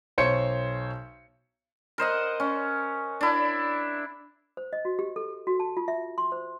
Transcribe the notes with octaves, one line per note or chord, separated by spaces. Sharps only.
B1 C5 C#5 C#7
A#4 C5 D#5 F#5
C#4
D4 E4
C5
D#5
F#4
G4
A4
F#4
A5
F4
E5
C6
C5